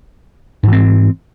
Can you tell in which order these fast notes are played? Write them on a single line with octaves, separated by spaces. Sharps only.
G#2 E3 C4